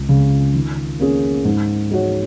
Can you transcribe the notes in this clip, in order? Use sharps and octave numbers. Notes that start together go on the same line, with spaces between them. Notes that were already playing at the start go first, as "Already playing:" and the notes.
Already playing: C#2
C#3 G#3
D#3
A#3 C#4 G#4
G#2
G#3 D#4 F#4 C#5